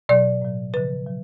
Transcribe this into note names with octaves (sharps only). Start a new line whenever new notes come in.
B2 F#3 D5
A2 F#3
C#3 F3 B4
F#3